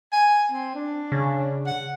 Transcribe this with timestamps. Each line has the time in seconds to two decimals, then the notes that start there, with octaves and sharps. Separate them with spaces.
0.12 G#5
0.52 C4
0.75 D4
1.12 C#3
1.67 F#5